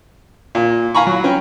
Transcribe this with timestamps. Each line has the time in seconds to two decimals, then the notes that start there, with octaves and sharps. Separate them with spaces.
0.55 A#2
0.95 F5 G#5 A#5 B5 C#6
1.07 F#3
1.24 C#4 G5